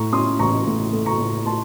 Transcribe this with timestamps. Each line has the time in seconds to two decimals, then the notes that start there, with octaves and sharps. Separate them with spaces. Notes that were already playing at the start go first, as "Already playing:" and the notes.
Already playing: A2 A#5 C#6
0.12 C#4 C6 D#6
0.39 A1 A#5 C#6
0.66 A2
0.93 A3
1.06 A#5 C#6
1.19 A2
1.46 A3 A5 C6